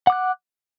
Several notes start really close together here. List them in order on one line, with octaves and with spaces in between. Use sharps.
F#5 D6 F#6